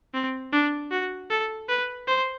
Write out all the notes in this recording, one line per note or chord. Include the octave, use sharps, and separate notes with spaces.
C4
D4
F#4
A4
B4
C5